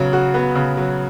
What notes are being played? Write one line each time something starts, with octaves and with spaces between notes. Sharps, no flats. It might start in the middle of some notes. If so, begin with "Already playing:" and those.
Already playing: C#3 F#3 B3
F#4
B3
C#3
F#3